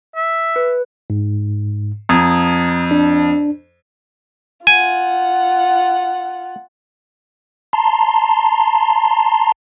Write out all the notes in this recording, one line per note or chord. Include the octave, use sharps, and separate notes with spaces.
E5
B4
G#2
F2 A#5 D#6 G#6
D4
F4 F#5 G#5
A5 A#5 C6